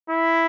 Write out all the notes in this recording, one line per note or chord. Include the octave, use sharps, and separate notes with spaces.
E4